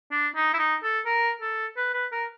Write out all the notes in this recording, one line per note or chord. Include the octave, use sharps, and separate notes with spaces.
D4
D#4
E4
D#4
A4
A#4
A4
B4
B4
A#4